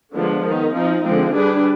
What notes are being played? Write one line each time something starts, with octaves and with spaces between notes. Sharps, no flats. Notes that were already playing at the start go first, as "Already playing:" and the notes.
D3 F3 G#3 B3 D4
D#3 B3 D#4
F3 C4 D#4
D3 F3 G#3 C4
G3 D4 G#4 B4